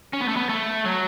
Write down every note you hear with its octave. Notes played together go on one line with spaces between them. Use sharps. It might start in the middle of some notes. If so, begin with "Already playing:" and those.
C#4
B3
A3
B3
A3
F#3